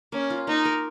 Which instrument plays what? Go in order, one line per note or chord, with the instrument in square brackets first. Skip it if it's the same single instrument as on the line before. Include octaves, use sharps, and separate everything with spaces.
[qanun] A#3 [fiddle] C#4
[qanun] F4
[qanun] A#3 [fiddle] D#4
[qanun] A#4